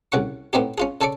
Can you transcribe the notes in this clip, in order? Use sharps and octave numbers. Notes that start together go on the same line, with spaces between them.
C2 C#3 F#5 C#6
A2 B3 C4 D#4 G4
C#4 F4 G#4
C#3 A4 C#5 D5 C#6 D6